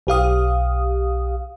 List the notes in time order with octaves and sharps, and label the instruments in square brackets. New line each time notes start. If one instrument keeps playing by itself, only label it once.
[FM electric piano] B1 G4 F5 D#6